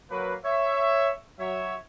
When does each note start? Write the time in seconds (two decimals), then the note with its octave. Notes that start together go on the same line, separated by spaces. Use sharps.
0.11 F#3 A#3 B4
0.45 C#5 E5
1.39 F#3 C#5 E5